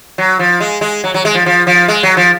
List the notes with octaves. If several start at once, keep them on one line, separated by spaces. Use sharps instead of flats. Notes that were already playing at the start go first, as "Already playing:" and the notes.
F#3
F3
G#3
G#3
F#3
F#3
G#3
F3
F3
F3
G#3
F#3
F3